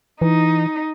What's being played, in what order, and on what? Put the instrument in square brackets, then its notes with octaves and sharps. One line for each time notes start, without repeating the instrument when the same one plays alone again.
[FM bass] E3 [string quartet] D#4